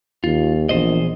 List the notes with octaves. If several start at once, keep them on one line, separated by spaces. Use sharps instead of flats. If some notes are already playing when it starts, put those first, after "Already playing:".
D#2 F4
A#1 E2 C5 D#5